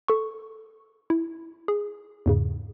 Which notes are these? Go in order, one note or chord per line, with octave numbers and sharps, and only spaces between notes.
A4 C#6
E4
G#4
E2 G#2 C#3